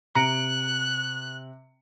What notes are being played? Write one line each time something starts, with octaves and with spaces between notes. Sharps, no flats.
C3 A#5 F#6 C#7 D7